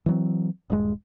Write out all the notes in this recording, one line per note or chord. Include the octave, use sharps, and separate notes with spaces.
E3 F#3 C4
D#1 G2 G3 G#3